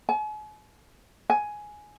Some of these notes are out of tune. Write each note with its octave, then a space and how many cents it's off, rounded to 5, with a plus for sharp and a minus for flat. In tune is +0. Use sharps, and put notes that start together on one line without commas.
G#5 +45
G#5 +10